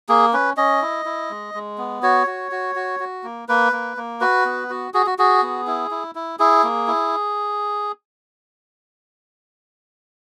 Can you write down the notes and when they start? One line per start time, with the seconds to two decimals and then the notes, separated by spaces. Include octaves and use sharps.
0.09 A#3 G#4
0.33 C#4 B4
0.57 C#4 D#5
0.82 E4
1.05 E4
1.30 G#3
1.54 G#3
1.78 B3
2.03 F#4 C#5
2.27 F#4
2.52 F#4
2.75 F#4
3.00 F#4
3.24 A#3
3.49 A#3 B4
3.73 A#3
3.97 A#3
4.21 F#4 B4
4.45 B3
4.70 F#4
4.94 F#4 G#4
5.06 F#4
5.18 F#4 G#4
5.42 B3
5.67 E4
5.91 E4
6.15 E4
6.39 E4 G#4
6.63 A#3
6.88 E4